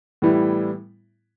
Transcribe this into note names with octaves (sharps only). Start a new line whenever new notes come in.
A2 E3 G3 B3 E4